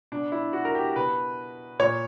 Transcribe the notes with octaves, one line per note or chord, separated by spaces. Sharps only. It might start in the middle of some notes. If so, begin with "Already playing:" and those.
B2 D4
E4
F#4
A#4
G4
B2 B4
A#2 C#5